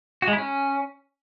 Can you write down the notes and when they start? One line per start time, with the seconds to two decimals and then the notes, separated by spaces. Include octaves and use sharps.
0.22 F#4
0.28 G#3
0.33 E4
0.38 C#4